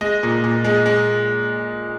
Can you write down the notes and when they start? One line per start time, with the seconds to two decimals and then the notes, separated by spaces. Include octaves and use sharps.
0.01 G#3 D#5
0.23 A#2
0.44 A#2
0.64 G#3
0.86 G#3